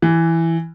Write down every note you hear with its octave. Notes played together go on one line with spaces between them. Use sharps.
E3